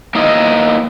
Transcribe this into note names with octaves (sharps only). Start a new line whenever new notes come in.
A#3 B3 D#4 E4 A#4 D#5